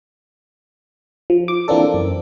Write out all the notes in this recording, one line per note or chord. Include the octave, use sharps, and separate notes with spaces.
F3
D6
E3 A#3 C4 D4 A4
F#2